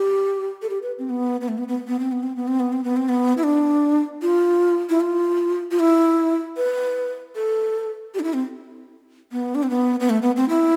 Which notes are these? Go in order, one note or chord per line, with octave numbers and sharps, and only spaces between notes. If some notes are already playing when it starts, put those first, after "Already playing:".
Already playing: G4
A4
G4
B4
C4
B3
B3
A3
B3
B3
B3
C4
B3
C4
B3
C4
B3
C4
B3
C4
B3
E4
D4
F4
E4
F4
F4
E4
B4
A4
G4
D4
E4
C4
B3
D4
C4
B3
B3
A3
B3
C4
E4